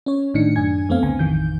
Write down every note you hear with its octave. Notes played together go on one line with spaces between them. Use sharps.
C#4 C#5
G#1 A2 D#3 D4 D#4 C#7
F#2 D4 G#5 G#6
F2 A3 B3 C4 F5
G#1 C#2 D3 G#5
A1 F2 D#3 E3 G6